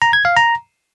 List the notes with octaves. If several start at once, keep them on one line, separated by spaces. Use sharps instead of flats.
A#5
G#6
F5
A#5